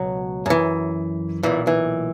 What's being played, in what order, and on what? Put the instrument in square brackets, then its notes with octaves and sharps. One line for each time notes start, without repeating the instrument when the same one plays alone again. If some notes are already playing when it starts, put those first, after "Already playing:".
Already playing: [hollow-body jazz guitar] C#2 B2 F#3
F#2 E3
B1 A#2 E3
E3